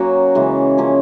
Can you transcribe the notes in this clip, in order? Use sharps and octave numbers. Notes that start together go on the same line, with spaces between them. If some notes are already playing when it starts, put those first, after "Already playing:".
Already playing: F#3 A#3 C#4 F#4
C#3 E3 G#3
F3 A#3 C#4